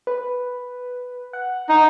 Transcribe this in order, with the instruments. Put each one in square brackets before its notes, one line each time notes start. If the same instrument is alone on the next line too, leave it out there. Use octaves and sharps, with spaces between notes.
[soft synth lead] B4
F#5
[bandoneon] D#4